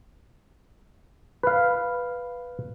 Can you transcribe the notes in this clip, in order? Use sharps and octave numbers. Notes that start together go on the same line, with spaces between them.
B4 F5